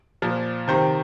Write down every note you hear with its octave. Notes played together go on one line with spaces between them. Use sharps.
A#2 F3
C3 D#3 C5